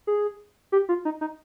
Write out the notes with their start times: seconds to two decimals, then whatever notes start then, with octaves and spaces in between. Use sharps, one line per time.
0.07 G#4
0.72 G4
0.89 F4
1.05 D#4
1.21 D#4